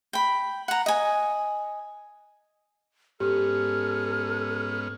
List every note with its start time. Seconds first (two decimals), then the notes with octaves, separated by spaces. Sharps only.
0.13 G5 B5
0.68 F#5 A#5
0.86 D#5 G#5
3.20 G#2 B3 C#4 G4 A4 F6